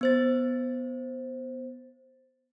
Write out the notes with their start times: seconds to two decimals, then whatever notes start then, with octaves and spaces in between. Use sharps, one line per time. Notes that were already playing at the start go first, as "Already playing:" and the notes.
0.01 B3 C5 A6